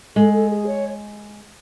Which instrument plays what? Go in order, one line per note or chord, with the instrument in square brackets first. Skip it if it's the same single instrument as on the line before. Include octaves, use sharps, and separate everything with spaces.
[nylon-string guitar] G#3 [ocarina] A4
[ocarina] A4
G#4
C#5